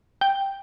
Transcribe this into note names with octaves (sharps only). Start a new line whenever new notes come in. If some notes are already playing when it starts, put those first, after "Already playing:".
G5